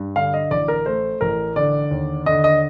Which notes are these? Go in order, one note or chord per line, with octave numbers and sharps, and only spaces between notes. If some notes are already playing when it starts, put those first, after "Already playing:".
Already playing: G2
D3 F5
D#5
A1 D5
A#4
A3 C5
A1 A#4
D3 D5
D#2
D3 D#5
D#5